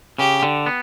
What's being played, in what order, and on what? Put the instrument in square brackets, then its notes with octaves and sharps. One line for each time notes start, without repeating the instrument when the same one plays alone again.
[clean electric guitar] C#3 [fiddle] G4
[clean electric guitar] D3
B3